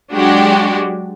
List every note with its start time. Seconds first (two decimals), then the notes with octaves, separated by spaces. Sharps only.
0.14 F#3 G#3 D4 F#4 G4